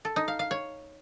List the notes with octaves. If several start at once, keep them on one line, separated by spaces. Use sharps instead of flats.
A4
D#4
F5
F5
C#5